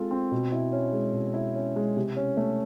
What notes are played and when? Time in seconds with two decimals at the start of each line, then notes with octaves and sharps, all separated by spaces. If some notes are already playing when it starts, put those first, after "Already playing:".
Already playing: G#3 C4 F4 A4
0.11 C4
0.31 B2
0.52 E4
0.72 C#4
0.93 G#3
1.14 B2
1.34 E4
1.55 C#4
1.76 G#3
1.97 C3
2.17 C#4
2.37 A3